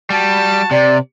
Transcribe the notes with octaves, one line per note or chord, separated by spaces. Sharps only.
G3 F#4 A5
C3 D5